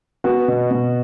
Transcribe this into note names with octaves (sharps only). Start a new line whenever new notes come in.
B3 F#4
B2
B2